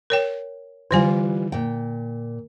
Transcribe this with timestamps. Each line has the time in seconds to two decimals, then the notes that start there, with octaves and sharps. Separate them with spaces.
0.10 A#4 C#5 G5
0.91 D3 E3 G3 F4 C5 G#5
1.52 A#2 G5